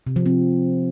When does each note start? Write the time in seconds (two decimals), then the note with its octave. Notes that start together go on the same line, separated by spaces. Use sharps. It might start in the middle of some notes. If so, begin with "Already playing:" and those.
0.07 C3
0.16 F3
0.26 C4